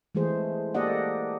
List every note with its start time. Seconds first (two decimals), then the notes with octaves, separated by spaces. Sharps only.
0.15 E3 G#3 A3 G#4 C5
0.74 A#3 G4 A4 D5 D#5 F#5